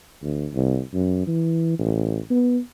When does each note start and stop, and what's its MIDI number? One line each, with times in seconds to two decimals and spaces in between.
0.23 0.47 38
0.54 0.80 36
0.94 1.24 42
1.27 1.79 52
1.79 2.19 33
2.30 2.59 59